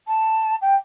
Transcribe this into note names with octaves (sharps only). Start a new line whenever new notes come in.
A5
G5